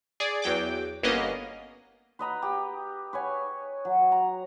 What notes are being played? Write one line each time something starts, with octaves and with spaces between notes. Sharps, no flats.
G#4 D5
E2 F#3 G5 D6
G1 A#3 B3 C#4 D#5
B4 D#5 A#5 B5
G4
B4 C#5 G#5
F#3
A#5